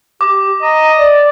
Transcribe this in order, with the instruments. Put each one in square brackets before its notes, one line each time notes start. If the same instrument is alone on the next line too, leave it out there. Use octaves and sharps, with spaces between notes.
[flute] G4 [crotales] D6
[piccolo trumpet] D#5 [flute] A#5
[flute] D5